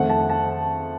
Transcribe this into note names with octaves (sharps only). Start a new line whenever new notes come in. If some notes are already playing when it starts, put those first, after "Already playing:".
Already playing: F2 D#3 A3 F#5
A5
A5